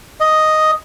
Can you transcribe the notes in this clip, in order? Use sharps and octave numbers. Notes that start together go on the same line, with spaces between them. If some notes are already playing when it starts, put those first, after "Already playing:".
D#5